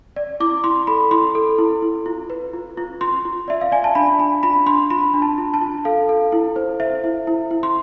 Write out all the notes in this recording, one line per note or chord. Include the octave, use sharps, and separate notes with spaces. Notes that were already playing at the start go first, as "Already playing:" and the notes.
D5
E4 D6
E4 C6
A4 B5
E4 C6
A4
E4
E4
F4
B4
F4
F4
F4 C6
F4
D5 E5
F5
D5 G#5
A5
D4 B5
D4 B5
F4 B5
D4 C6
F4 B5
D4
A5
F4
A5
F4
A4 F5
A4
E4
C5
C5 E5
E4
E4
E4
C6